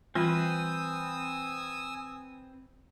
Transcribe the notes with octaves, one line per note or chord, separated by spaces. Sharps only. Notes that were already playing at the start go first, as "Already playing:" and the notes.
E3 G3 C4 F4 B4 G#5 D#6 E6